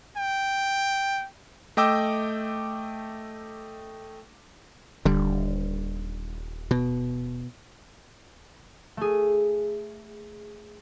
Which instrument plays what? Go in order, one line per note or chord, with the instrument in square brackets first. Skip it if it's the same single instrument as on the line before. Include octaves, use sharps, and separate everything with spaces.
[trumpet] G5
[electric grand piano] A3 D#5 G5 D6 E6
[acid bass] D#1 [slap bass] D3 G3
[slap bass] B2
[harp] A3 G#4